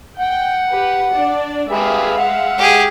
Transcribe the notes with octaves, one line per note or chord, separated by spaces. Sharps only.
F#5 G5
G4 B4
D4 D5
G#3 G4 G#4 B4 E5 F5
F#5
G4 G#4